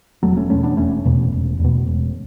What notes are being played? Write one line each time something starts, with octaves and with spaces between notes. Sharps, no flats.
E1 F#3 A3
A3 C#4
E2 B2 A3 C#4
B3 D4
E1 A3 C#4
E2 B2
E1
E2 B2
E1